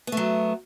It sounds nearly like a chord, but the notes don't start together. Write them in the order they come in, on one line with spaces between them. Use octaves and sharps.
B3 A3 F#3